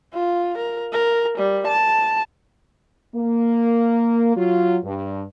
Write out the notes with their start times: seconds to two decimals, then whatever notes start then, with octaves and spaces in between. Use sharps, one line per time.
0.13 F4
0.58 A#4
0.92 A#4
1.38 G3
1.67 A5
3.15 A#3
4.36 F#3 F4
4.84 G2